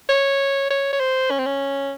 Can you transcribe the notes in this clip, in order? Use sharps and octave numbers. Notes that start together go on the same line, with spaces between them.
C#5
C#5
C#5
C5
C#4
C4
C#4